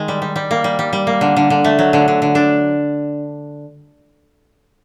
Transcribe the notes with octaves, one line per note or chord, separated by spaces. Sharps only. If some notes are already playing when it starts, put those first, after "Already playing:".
Already playing: D#3 G#3
G3
G3
G3
A#3
G3
G3
G3
A#3
D3
D3
D3
A3
F#3
D3
D3
D3
D4